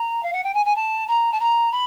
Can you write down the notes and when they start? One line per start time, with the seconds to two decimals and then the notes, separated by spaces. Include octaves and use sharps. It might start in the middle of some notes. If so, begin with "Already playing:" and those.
Already playing: A#5
0.23 F5
0.33 F#5
0.43 G5
0.54 G#5
0.65 G#5
0.75 A5
1.08 A#5
1.32 A5
1.40 A#5
1.72 B5